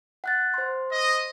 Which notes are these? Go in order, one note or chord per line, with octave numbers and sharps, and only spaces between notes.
F#5 F#6 A6
C5 C6
D#5